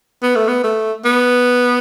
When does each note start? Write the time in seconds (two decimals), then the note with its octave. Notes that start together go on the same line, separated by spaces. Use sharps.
0.22 B3
0.35 A3
0.48 B3
0.64 A3
1.05 B3